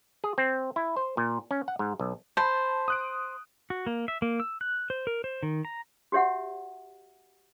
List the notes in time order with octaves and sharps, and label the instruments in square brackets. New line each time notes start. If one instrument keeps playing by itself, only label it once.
[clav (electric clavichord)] G#4
C4
E4
C5
A#2
C#4
F#5
G#2
B1
[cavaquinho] C5 [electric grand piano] A5 B5
[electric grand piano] D#6 F#6 D7
[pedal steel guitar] F#4
A#3
E5
A#3
E6
F#6
C5
A#4
C5
D#3
A#5
[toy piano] F#4 G4 C#5 E5 F#5